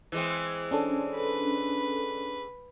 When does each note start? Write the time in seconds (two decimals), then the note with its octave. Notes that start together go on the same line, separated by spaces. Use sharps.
0.12 E3 G#3 C4
0.71 C#4 D4 A4
1.16 B4